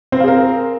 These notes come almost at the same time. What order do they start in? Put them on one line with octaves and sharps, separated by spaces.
C4 C5 F5 G#4 A#4